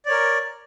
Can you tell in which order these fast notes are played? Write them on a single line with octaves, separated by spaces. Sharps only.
D5 C#5 A#4